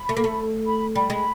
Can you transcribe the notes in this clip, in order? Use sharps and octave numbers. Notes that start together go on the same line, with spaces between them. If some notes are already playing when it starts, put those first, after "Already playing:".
Already playing: B5
A3
A#3
A3
B5
G3 B5
G#3